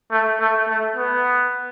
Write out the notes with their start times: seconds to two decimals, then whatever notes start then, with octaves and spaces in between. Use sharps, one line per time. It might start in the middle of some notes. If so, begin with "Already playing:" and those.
0.11 A3
0.40 A3
0.68 A3
0.96 B3